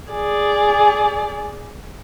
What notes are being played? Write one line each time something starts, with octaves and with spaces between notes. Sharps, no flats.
G#4 D5